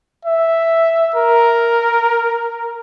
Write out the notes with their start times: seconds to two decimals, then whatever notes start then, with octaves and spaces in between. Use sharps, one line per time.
0.25 E5
1.16 A#4